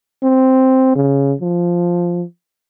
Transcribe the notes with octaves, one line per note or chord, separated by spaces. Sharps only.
C4
C#3
F3